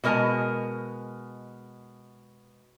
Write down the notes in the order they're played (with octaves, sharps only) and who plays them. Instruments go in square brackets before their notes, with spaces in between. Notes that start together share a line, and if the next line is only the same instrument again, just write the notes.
[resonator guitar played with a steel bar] B2 G#3 A#4 C#5 G#5 A5